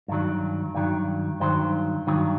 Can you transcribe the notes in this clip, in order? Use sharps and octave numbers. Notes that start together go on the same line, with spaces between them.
G2 D#3 F#3
G2 D#3 F#3
G2 D#3 F#3 C5
G2 D#3 F#3